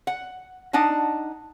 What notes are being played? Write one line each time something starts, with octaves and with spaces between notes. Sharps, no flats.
F#5
D4 D#4 F#5 A5